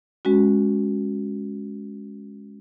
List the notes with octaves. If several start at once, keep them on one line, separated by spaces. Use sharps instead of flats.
G#3 C#4 F#4